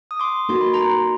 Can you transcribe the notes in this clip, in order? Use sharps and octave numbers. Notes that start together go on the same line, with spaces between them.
D#6
C6 D6
A#3 D#4 F#4 A4 C6
B5
A#5 C6